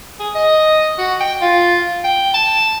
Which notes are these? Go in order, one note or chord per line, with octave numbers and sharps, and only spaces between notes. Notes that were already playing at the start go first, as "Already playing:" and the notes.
G#4
D#5
F#4
G5
F4
G5
A5